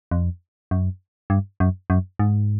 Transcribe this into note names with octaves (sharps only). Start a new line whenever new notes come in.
F2
F#2
G2
F#2
F#2
G#2